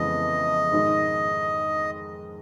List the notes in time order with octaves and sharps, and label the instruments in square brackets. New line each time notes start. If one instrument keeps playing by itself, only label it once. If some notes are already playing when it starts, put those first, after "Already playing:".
Already playing: [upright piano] F2 C#3 E3 G#3 B3 [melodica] D#5
[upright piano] G#2 D#3 G#3